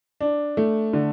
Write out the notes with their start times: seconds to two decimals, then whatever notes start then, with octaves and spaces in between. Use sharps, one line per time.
0.20 D4
0.57 A3
0.93 D3